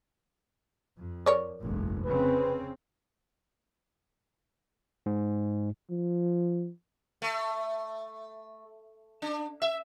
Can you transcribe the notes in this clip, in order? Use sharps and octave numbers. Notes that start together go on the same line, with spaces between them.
F2
A#4 C#5 D5
F1 A#1 G2
C#3 C4 B4
G#2
F3
A3
D4
E5